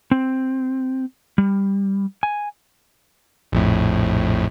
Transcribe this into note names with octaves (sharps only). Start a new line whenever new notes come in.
C4
G3
G#5
A#1 F2 A2